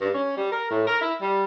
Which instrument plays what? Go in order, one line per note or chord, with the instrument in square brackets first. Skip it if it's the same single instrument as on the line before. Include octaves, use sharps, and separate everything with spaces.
[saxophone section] G2
C#4
G3
A#4
A2
A#4
E4
G3